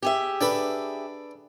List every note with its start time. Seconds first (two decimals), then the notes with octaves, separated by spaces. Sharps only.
0.02 G4 G#4 E5
0.41 D4 A4 B4